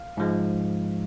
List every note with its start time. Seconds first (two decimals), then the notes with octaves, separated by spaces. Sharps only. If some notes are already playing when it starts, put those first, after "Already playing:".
Already playing: F5
0.17 G#2 F3 G#3